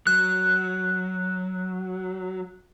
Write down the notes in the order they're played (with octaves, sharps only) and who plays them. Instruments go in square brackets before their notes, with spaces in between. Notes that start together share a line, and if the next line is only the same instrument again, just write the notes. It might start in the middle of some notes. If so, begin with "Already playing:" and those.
[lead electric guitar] F#3 [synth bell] F#6